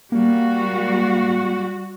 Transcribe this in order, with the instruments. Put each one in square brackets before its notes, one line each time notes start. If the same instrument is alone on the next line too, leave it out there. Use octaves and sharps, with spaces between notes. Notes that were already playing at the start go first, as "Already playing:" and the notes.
[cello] G3 F#4 [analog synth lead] A#3